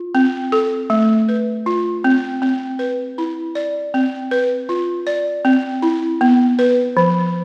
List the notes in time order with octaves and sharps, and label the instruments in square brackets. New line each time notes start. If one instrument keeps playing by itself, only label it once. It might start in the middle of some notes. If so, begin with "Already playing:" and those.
Already playing: [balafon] F4
C4
A4
A3
B4
F4
C4
C4
B4
E4
D5
C4
B4
F4
D5
C4
E4
B3
B4
F3